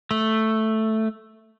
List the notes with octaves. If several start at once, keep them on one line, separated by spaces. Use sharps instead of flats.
A3